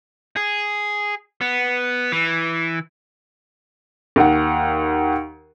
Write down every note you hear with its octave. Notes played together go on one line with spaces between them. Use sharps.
G#4
B3
E3
D#2 F#5